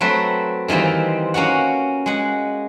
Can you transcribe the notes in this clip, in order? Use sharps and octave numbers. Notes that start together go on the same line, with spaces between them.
F#3 A3 C4 B4
D#3 E3 G3 A#3 C4
A#3 C#4 F#4 F#5
G#3 F#5